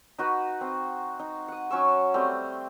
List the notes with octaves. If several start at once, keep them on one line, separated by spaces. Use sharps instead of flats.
D#4 F#4 B4
C4
D#4
F#5 D#6
F#3 C#4 C#6 E6
G3 A3 C4